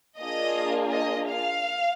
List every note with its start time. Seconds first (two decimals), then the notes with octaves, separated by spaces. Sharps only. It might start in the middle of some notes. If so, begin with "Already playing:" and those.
0.20 A#3 D4 F4 G#4 D#5
0.92 D#5
1.29 F5